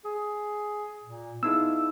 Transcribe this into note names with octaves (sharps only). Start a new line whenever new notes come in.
G#4
A#2
B3 D#4 E4 G#4 E6